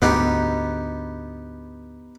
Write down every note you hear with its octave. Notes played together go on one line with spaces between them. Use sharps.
D2 G#2 B3 D#4 G4